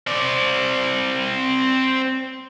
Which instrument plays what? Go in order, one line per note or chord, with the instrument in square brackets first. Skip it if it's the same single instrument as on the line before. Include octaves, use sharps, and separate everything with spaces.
[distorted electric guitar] C4 D5